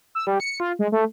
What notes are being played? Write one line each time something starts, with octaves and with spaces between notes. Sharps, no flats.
E6
G3
C#7
F4
G#3
A3